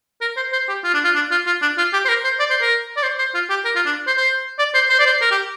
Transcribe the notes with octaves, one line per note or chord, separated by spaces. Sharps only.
A#4
C5
C5
G4
F4
D4
F4
D4
F4
F4
D4
F4
G4
C5
A#4
C5
D5
C5
A#4
D5
C5
C5
F4
G4
A#4
F4
D4
C5
C5
D5
C5
C5
D5
C5
A#4
G4